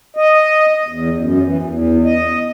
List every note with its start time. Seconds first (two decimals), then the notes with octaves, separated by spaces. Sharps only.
0.17 D#5
0.88 E2
1.18 F#2
1.44 E3
1.63 E2
2.05 D#5